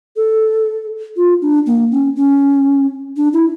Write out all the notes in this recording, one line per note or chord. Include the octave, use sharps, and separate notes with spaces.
A4
F4
D4
A#3
C#4
C#4
D4
E4